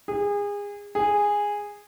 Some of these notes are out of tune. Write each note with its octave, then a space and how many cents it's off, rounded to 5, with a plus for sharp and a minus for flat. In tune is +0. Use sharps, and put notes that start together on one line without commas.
G#4 -30
G#4 -10